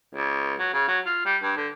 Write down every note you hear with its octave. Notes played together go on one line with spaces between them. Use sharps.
C#2
F#3
C#3
F#3
F4
G3
G2
D3